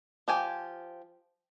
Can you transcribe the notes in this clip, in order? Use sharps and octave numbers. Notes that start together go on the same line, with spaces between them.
F3 G4 G#5